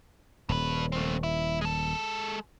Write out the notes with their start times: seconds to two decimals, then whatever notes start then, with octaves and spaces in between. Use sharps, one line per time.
0.49 D#1 G2 B4
0.92 A3 C4
1.23 E4
1.61 G#3 A4